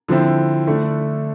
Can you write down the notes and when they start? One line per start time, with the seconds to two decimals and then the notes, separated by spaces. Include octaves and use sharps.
0.08 D3 F3 C4 E4
0.67 D3 A3 D4